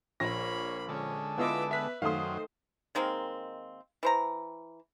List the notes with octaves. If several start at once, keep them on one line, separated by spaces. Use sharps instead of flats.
A#1 A#3 C#5 B5 A#6
D3 G#3 C#4 A4
B3 E4 F4 D#5 E5 D6
B4 E5 B6
F#2 D#3 F#3 A3 C5 F5 C6 D#6
D#3 G#3 A#3 C4
E3 C5 A#5